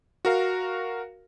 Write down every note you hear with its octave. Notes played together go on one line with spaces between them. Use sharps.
F#4 A#4 F5